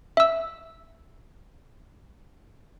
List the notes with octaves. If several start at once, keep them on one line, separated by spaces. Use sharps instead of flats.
E5 E6